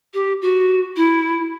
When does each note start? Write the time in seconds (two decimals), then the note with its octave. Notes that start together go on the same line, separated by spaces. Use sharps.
0.14 G4
0.42 F#4
0.96 E4